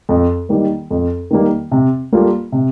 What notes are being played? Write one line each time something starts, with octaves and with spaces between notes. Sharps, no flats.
F2
D#3 G3 A#3
F2
D#3 G3 A#3
C3
G3 A#3 F4 A4
C3